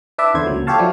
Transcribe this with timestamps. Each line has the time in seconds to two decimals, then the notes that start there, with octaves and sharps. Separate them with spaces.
0.18 D4 E4 B4 D5 E5
0.34 E2 D3 C5 G#6
0.47 C#2 A#2 F#3
0.67 F4 G4 A4 C#5 F5 A5
0.79 F3 F#3 D4 E4